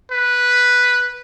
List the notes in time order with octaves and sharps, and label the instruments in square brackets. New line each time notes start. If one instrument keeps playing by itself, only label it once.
[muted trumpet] B4